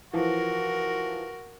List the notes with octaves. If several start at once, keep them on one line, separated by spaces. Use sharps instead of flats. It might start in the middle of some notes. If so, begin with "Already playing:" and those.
E3 F3 F#4 A#4